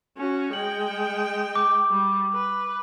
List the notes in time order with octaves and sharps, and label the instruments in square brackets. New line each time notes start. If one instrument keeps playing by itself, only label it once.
[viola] C#4 F#4
[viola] G#3 G5 [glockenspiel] F#7
[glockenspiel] D6
[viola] G3
B4